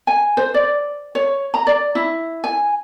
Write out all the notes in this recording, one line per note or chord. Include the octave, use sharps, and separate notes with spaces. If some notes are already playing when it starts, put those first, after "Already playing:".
G#5
C5
D5
C#5
A#5
D5
E4
G#5